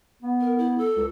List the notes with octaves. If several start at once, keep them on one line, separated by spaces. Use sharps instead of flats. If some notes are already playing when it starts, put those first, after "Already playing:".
B3
A#4
E4
A4
C#2